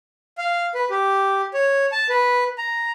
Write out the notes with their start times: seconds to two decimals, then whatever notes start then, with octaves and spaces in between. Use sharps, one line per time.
0.38 F5
0.74 B4
0.90 G4
1.54 C#5
1.92 A5
2.09 B4
2.58 A#5